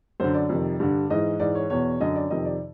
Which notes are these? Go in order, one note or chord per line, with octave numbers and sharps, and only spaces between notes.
F#2 D3 C5
D5
F2 C3 D#3
G2 D3
G#2 E3 D#5
G#2 E3 D5
C#5
E2 B2 C#5
F#2 D3 D#5
D5
F2 C3 D#3 D#5
D5